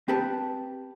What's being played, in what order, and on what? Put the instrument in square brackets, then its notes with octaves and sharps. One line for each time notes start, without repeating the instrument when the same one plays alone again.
[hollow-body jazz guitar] C4 B4 A5 [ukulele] G4